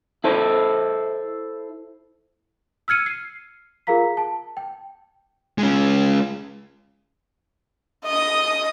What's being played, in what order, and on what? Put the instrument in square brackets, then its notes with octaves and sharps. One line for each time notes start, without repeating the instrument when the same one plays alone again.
[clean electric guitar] E4 A4 C5
[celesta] E6 F6 G#6 C#7 D#7
C7
F4 G#4 A#4 F5 A#5 B6
A5
G5
[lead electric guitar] G#3 C#4
[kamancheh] D#5 D#6